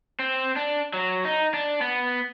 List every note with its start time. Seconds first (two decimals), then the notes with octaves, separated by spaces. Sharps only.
0.19 C4
0.56 D4
0.93 F#3
1.25 D#4
1.54 D4
1.81 B3